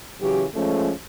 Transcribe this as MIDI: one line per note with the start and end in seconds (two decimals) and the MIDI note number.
0.21 0.44 49
0.21 0.44 52
0.21 0.44 54
0.21 0.44 61
0.21 0.44 67
0.55 0.91 53
0.55 0.91 56
0.55 0.91 57
0.55 0.91 61